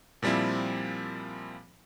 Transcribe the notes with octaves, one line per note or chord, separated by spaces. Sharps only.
A#2 F3 G3 C4 E4